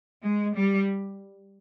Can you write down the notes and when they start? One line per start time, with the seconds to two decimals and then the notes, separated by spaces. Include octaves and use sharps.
0.23 G#3
0.56 G3